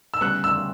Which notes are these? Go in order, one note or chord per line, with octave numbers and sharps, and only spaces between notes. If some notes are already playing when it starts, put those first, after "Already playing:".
E6
D2 C#3 G3 B3 F#6
E6